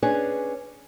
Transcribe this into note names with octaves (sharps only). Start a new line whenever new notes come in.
C#4 D4 G#4 B4 C#5